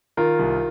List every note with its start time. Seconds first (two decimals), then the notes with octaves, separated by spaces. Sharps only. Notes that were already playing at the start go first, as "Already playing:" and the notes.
0.17 D#3 F4 A#4
0.39 C2